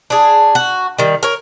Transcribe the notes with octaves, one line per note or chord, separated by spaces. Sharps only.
D4 G#4
F#4
D#3 G3
A#4 C#5